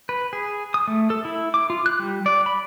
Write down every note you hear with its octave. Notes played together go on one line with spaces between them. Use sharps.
B4
G#4
D#6
A3
A4
E4
D6
F4
F#6
G3
D5
B5